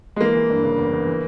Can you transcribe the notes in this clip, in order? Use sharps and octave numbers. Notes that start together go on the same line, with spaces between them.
G#3
E3 A#3
E3
G2
C#3
E2
E2
E3